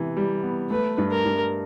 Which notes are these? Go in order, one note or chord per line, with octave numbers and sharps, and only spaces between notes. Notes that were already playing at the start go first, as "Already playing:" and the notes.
Already playing: C3 E3 B3
G3
B3
A3 B4
G2
A#4
G2